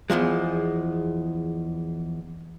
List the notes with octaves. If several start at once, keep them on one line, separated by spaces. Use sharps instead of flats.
E2 G#2 F3 G#3